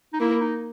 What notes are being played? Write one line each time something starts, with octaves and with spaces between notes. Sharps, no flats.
D#4
A#3 E4
D#4